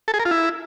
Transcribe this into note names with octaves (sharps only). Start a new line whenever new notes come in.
A4
G#4
A#4
F4
E4